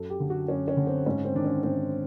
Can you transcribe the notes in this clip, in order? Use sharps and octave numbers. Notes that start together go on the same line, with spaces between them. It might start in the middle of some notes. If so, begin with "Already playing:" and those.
Already playing: F#2 A4
G4
D3
F#4
F#2 C#4
C#4
D3
C4
G#2 C#4
C4
D#3 D4
C#4
G#2 C4